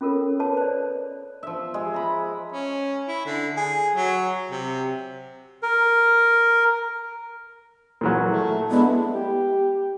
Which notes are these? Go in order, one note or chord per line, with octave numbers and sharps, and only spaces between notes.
C#4 F4 A4 A#4 C#5
B4 C#5 A5
C5 D5
F3 E5
G#3
A#5 B5
C#4
E4
D3
G#4
F#3
C3
A#4
A#2 E3 F#3
A3
G#3 B3 D4 E4
G4